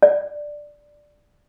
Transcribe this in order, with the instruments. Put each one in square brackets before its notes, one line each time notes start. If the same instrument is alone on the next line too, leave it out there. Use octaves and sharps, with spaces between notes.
[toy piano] D5